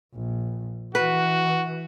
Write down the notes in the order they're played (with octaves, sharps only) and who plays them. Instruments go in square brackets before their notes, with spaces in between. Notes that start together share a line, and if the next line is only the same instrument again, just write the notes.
[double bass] A#1
[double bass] E3 [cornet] F#4 [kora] B4